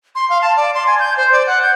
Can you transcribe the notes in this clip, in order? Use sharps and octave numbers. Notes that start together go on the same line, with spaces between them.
C6
F5
A5
D5
C6
G#5
G6
C5
D5
F#5
G6